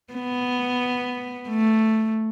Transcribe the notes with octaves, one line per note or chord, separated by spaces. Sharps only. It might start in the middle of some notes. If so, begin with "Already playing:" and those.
B3
A3